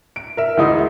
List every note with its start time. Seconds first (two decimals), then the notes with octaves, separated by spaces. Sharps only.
0.16 D7
0.37 A#4 E5
0.57 D2 E3 G#3 D#4 E4 D#6